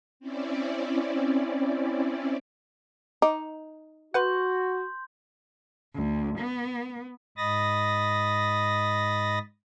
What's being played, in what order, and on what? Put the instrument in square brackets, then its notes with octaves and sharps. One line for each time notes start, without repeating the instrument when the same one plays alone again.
[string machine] C4 C#4 E4 D5
[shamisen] D#4 [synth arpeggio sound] D6
[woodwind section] F#4 [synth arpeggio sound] B4 F#5 [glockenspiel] C6 G6
[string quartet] D2
B3
[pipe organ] G#2 D#5 B5 D#6 A6 A#6